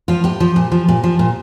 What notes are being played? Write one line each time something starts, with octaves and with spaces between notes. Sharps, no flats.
F3 F4
A2 G4
F3
A#2
F3
A#2
F3
A#2